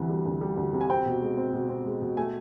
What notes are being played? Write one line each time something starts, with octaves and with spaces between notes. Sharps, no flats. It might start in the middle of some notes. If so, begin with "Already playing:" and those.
Already playing: D2 C3 E3
G3
D2
G3
D2
C3
G#5
C4 G5
B2
G#3
C4
B2
C4
G#3
B2
A3 G#5